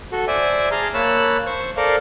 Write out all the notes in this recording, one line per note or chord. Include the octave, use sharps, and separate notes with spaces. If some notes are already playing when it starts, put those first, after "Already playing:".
F#4 A4
C5 D5 E5 G#5
G#4 A5 A#5 C6 F6
A#3 C#5 A5 B5 E6 F#6
C5 C#6
A4 A#4 C5 D5 F5